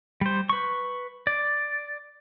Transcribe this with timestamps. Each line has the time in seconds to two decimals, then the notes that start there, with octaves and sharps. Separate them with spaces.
0.21 G3 C5
0.49 B4 C#6
1.27 D5